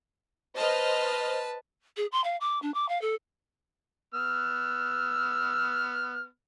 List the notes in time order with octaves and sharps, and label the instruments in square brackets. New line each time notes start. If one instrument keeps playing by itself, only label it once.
[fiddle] B4 A5 [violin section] C5 D#5 F6
[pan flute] G#4
C6
F5
D6
D4
D6
F5
A4
[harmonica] B3 E6 F6